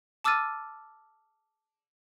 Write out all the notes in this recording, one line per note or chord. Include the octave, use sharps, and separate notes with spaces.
A5 D6 E6 F6 A6 D#7